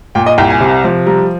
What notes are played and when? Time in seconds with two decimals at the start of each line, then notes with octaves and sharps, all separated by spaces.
0.15 A#2 G5
0.26 D#5
0.38 C2 G5
0.50 G#5
0.61 C3
0.84 F3
1.06 G3 A#5